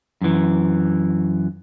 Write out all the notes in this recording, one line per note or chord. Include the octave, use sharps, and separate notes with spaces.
F#2 E3